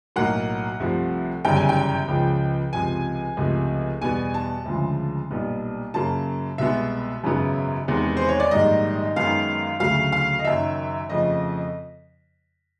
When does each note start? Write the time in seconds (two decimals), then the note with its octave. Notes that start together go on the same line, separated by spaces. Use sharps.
0.16 B1 A2 F#3 A#3 F#5
0.80 C2 C3 F3 A3
1.44 G1 F#2 C#3 E3 G3 G5
1.56 G#5
1.69 G5
2.08 C#2 C#3 F3
2.73 C#2 C3 F3 G#5
3.37 C#2 C3 F3 A3
4.01 E2 B2 G3 B3 G#5
4.34 A5
4.66 D2 C#3 F3 G#3
5.30 B1 A#2 G3 B3
5.94 F#2 C#3 F#3 A#3 A5
6.58 C2 B2 G#3 B3 E5
7.23 G#1 F#2 C#3 F#3 B3
7.88 E2 C3 D#3 G#3 B3
8.17 C5
8.29 C#5
8.40 D5
8.51 A#1 G#2 D#3 G3 D#5
9.16 F#2 D#3 G#3 B3 F5
9.80 D2 C#3 F#3 A3 F5
10.12 F5
10.39 D#5
10.44 F#1 F#2 D#3 E5
11.09 F2 C#3 F3 A3 D#5